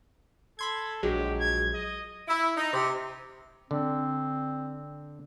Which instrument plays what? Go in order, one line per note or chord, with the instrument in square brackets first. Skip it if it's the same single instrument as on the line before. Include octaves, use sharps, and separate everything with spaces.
[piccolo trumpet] A4 [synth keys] B5 C6 G#6
[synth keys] A#1 F#3 G#3 [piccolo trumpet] G4
[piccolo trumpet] G#6
D#5
[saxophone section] E4
D#4
C3
[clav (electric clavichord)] D3 [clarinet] C4